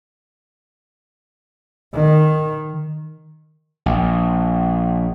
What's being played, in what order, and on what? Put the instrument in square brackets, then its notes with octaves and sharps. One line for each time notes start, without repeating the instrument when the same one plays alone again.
[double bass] D#3
[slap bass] A#1